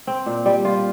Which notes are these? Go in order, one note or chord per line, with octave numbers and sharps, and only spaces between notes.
C4
A#2
G3
F4